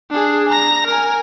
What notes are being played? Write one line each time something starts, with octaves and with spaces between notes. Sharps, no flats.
D4 G#4
A#5 A#6
A#4 G#5